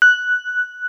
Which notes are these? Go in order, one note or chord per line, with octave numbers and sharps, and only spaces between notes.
F#6